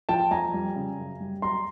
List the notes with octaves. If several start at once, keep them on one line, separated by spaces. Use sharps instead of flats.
F3 G5 A5
F2 G#5 A#5
G3
C#3
F#2
G3
F#3 A#5 C6